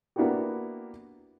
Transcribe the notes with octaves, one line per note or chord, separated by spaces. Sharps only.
A#3 B3 D4 E4 F#4 G4